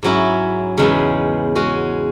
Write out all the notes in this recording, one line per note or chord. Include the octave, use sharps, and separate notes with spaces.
G#2 F#3 C#4 E4
E2 C#3 G#3 B3 D#4
G#3 C#4 F#4